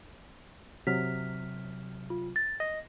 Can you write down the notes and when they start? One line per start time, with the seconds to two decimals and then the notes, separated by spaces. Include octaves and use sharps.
0.87 C3 F#3 F6 B6
2.10 F4
2.36 A6
2.60 D#5 A#6